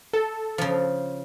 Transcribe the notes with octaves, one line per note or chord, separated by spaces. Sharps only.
A4
C#3 F3